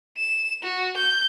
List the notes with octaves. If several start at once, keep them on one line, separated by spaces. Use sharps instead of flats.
E7
F#4
G6